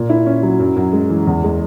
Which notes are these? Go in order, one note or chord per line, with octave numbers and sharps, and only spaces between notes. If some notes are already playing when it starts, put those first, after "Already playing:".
Already playing: A#2
E4
C#4
F#3
F#2
F#2
G#3
E3
E2
G#3